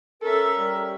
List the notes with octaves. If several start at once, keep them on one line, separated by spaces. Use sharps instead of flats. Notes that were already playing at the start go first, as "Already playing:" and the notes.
C#4 A4 A#4 E5
G3